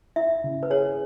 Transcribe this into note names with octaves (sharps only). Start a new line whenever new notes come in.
E4 E5
C#3
B4
G#4 C#5